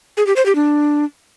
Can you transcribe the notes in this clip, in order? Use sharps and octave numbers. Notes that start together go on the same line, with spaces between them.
G#4
G4
C5
G4
D4